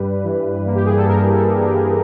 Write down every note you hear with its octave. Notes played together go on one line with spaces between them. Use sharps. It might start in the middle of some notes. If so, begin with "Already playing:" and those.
Already playing: G2 G3 B4
E3
A#3
G4
G#4
A4
G2 A#4
A4
G3
G4